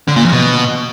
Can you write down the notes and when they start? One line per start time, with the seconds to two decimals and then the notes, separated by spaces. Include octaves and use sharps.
0.08 D3
0.16 A#2
0.24 F2
0.32 B2